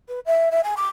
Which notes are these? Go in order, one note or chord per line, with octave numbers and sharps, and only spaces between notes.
B4
E5
E5
G#5
D6